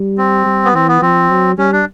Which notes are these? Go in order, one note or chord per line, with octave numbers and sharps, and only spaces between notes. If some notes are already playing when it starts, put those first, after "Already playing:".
Already playing: G3
C4
G3
B3
E3 C4
B3
F3 C4
F#3
G3 C#4
D4